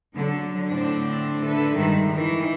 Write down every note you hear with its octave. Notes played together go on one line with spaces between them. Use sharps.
D3 F#3
A2 D3 A3 C4 D4
D3 A4 B4 E5
G2 D#3 G3 G#3
D#3 E3